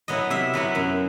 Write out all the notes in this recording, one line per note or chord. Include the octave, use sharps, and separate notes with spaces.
F#3 B3 E4 D#5
C3 E5
F#3 B3 E4
F#2